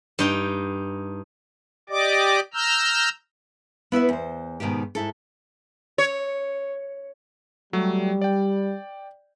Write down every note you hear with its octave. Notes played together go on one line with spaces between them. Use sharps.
G2 D#4 G5
G4 D5 D#5 D6
A#5 E6 F6 G6
B3 E4 B4 E5
E2 C5
G#2 B2 D#3 D#4 G4
G#2 E4 A4
C#5
F#3 G3 A3
D5 G5